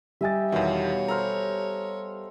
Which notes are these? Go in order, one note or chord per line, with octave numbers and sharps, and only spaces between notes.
G3 G4 D#5 E5 G#5 A6
E2 B2 D#3 C#5 D#5 F5
A4 C5 A#5 F6